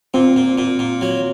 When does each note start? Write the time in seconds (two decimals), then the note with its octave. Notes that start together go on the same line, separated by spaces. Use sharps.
0.14 A#2 C4
0.36 A#2
0.58 A#2
0.79 A#2
1.01 F#3